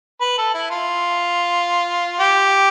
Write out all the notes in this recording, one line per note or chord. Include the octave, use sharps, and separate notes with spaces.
B4
A4
E4
F4
G4